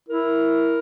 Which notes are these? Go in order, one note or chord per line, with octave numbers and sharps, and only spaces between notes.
E4 A#4